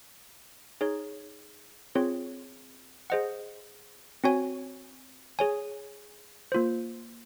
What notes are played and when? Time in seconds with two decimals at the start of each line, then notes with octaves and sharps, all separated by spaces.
0.81 D#4 G#4 C#5
1.95 C4 F4 G#4 C#5
3.10 G#4 C5 D#5 F#5
4.24 C4 F#4 C#5 G#5
5.39 G#4 C#5 G#5
6.52 A#3 F4 C5